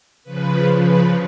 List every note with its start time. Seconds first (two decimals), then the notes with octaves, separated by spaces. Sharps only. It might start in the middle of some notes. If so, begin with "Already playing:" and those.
0.24 C#3 F3 B4
0.80 B4